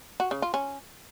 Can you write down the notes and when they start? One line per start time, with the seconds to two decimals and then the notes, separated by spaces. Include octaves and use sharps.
0.20 F#4
0.31 C#3
0.42 F4
0.54 C#4